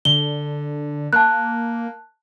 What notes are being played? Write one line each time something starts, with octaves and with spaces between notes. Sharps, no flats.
D3 G7
A#3 A5 F#6